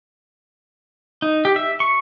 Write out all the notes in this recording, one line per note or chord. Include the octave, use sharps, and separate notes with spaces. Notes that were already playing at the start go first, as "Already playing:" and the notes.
D#4
G4
E5
C#6